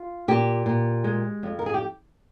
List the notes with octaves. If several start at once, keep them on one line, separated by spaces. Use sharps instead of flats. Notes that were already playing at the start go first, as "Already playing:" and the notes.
Already playing: F4
A#2 G4
A#2
G#3
F2
A#4
G#4
G4